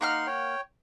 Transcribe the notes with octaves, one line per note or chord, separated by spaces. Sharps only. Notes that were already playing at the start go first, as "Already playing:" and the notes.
A#3 D#4 F#5 C6 F6
C#5 G5